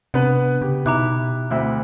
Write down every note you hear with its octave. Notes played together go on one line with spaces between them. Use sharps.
C3 B3 D4 B4
C#3 G4
B2 D#4 E4 A#5 D6 F#6
D2 C4 E4 E5